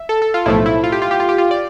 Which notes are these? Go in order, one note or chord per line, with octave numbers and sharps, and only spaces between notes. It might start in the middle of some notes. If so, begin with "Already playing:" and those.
Already playing: E5
A4
A4
F4
B1 A2 F3 A3 E4
E4
F4
G4
F4
G4
F4
G4
F4
D5